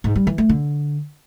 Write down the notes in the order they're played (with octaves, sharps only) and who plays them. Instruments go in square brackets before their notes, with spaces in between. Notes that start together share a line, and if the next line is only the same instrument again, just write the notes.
[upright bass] G#2
G3
E3
A3
D3